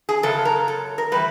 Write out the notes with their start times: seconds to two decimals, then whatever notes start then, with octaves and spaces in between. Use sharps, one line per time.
0.09 G#4
0.23 F#2 C#3 F#3 A4
0.45 A#4
0.68 A4
0.98 A#4
1.12 A2 E3 G3 B4